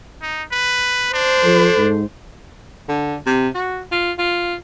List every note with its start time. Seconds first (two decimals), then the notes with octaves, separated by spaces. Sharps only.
0.22 D#4
0.52 B4
1.13 D4 C5
1.44 F3 A4
1.77 G#2
2.89 D3
3.26 C3
3.55 F#4
3.92 F4
4.19 F4